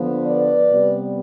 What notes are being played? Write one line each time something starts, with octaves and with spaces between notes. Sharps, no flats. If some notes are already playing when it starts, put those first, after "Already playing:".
Already playing: D3 F3 B3
B4 D5
C3 G3 B3